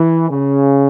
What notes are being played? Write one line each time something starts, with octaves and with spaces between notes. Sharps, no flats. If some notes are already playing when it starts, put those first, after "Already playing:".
Already playing: E3
C#3